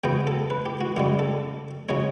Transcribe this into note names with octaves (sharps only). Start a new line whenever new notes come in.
C#3 F#3 B3 G5
A4
B4
G4
F#4
F#2 C#3 G3 G4
A4
C#3 F#3 C#4 C#5